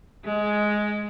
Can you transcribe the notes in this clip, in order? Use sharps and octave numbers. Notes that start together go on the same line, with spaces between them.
G#3